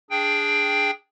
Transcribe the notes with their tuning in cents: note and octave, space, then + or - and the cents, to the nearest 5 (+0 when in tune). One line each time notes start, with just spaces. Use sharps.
D4 -5 G#4 +0 G5 +5